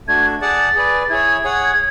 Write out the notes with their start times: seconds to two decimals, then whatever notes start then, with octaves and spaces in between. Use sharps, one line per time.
0.08 A3 D4 F#4 G#6
0.41 G#4 D5 F#5 A5 A6
0.75 G#4 B4 D5
1.09 E4 G#4 C#5 G#6
1.44 G#4 C#5 F#5